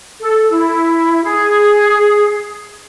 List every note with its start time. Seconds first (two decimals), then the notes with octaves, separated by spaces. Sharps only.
0.19 A4
0.50 E4
1.24 G#4